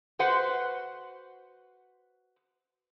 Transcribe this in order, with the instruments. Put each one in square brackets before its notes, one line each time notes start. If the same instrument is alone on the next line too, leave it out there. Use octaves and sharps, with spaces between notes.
[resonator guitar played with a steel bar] F#4 B4 C5 F#5